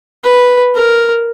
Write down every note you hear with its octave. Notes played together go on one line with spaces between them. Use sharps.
B4
A#4